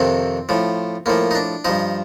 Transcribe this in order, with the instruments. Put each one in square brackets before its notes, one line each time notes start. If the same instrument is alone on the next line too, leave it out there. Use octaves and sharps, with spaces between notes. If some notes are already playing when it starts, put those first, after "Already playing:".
Already playing: [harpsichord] F2 C3 D#3 C4
A2 F3
A2 F3 A#3
D#4
D4
G2 F3 D#4